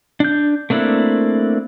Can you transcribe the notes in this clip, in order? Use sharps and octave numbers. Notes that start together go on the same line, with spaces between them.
D4 G6
A3 A#3 C4 D4 E4